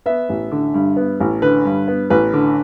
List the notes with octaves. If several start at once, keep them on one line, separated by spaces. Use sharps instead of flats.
B3 E5
A1
D3
G2
B3
A1
D3 B4
G2
B3
A1 B4
D3